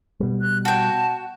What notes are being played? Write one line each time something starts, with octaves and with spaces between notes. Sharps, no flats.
B2 G3
F#6
F#4 G5 A5